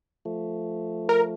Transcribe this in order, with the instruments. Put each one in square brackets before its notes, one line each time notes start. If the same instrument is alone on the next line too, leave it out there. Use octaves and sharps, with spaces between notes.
[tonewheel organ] F3 A3
[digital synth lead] A#4